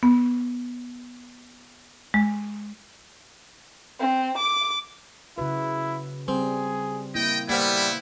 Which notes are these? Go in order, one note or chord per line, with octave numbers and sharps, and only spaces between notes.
B3
G#3
C4
D6
C#3 E4 F#4 B4
G3 C4 G#4
A#3 E4 D#5 G5
G3 A#3 B3 E4 C5 F5 F#5